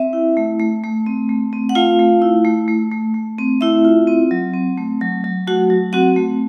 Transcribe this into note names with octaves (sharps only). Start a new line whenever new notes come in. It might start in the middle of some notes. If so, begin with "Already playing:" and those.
Already playing: C4 E5
E4
A3
A3
A3
C4
A3
C4
F#5
A3 F4 F5
A3
E4
A3
A3
A3
A3
C4
A3 E4 E5
F4
C4
F#3
C4
A3
F#3
F#3
A3 F#4 F#5
F#3
C4 F#4 F#5
A3